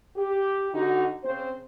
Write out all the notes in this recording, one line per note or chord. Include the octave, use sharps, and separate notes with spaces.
G4
D3 D#4 F#4
C#3 C4 C5